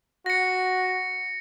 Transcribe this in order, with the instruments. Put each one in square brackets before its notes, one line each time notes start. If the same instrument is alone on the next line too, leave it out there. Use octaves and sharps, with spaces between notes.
[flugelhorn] F#4 [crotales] A#6 C#7